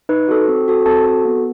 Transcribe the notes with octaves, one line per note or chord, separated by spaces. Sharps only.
D#4 B4
F#4 A4
C4
F#4 A4
C4 A4 A5
F#4 A4
B3